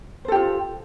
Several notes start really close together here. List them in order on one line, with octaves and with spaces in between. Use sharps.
C5 A4 G4 F4